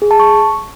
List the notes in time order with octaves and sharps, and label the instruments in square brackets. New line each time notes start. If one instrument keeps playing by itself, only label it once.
[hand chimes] G#4
A5
C#6